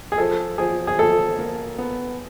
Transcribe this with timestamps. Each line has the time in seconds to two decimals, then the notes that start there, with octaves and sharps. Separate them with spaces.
0.12 G#4
0.18 F3 A4
0.58 F3 G#4
0.87 G#4
0.99 F3 A4
1.39 A#3
1.78 B3